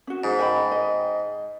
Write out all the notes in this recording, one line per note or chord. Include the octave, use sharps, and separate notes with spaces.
C#4 F#4
G#2
D#5 G5 B5
D#5